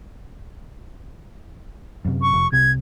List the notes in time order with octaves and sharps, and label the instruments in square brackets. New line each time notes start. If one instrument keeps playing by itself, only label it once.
[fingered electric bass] F#2 C3
[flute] C#6
[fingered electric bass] F1
[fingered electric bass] C2 C3 [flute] G#6